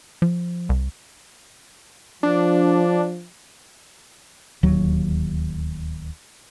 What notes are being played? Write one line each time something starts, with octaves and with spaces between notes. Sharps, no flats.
F3
C2
F3 D4
D1 D#2 F#3